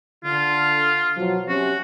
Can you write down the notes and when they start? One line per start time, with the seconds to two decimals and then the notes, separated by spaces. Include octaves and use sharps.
0.25 D3 F4
1.17 B2 F3 F#3
1.49 C3 C#4 F#4